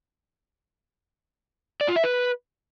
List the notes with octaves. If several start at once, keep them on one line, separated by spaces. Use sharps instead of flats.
D5
F4
E5
B4